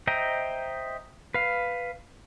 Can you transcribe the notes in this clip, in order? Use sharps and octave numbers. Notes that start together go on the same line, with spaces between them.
C5 D#5 E5 G5 A#5
B4 F5